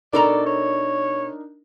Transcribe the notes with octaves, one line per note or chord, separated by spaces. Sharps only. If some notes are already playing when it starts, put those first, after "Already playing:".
B2 D4 D#4 A4 A#4 D5 A#5
C#5